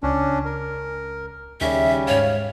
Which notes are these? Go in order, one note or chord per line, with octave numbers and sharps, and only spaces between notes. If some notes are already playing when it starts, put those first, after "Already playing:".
C#2 C#4 D4
A#4
D#2 C#3 G3 C#4 E5
G#2 C#5 F5